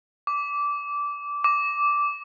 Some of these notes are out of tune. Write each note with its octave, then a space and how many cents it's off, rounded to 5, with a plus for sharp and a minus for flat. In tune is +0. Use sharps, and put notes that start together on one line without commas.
D6 -15
D6 -10